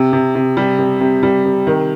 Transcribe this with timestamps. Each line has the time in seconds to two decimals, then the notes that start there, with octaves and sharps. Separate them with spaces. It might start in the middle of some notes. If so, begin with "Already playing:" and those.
Already playing: C3
0.13 C3
0.35 C3
0.57 G3
0.79 C3
1.00 C3
1.23 G3
1.45 C3
1.67 D#3